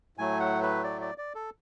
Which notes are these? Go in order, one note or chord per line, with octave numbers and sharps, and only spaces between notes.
A2 F#3 A3 G#5
F#5
B4
D5
D5
D5
A4